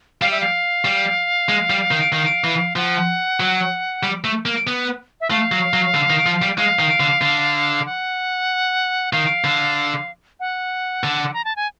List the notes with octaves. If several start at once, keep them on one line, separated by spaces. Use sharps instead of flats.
G3 F5
E5
F5
G3
G#3
G3
D#3
D#3
E3
F3 F#5
F#3
G3
A3
A#3
B3
E5
A3 F5
F#3
F#3
D3
D#3
F3
G3
G#3 F5
D#3
D3
D3
F#5
D#3 F5
D3
F#5
D3
A#5
A5
G#5